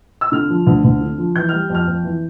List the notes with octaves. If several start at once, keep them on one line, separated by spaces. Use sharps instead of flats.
E6
D3 F6
F3
D2
D2
D3
F3
E3 G6
G3 F6
F2 F6
F2
E3